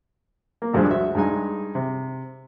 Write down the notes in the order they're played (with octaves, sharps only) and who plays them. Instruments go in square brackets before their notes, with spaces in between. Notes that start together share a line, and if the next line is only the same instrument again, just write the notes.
[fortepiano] A#3
D2 G2 D3 F3 G#3
F#4 E5
G2 G#3 D#4 G#5
C3